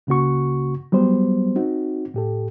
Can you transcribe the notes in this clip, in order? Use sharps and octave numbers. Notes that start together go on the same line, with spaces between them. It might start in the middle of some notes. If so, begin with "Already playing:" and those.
C#2 C#3 A#3 F#4 C#6
F#3 G3 B3 C5
C4 D#4 F#4
A2 G4 A4